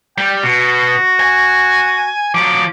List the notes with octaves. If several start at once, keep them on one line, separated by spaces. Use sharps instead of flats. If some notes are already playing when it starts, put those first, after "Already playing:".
G3 G5
B2 F#4
G#5
F3 F#3 D6